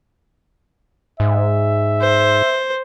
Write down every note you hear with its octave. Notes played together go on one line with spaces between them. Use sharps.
G#2 E5
C5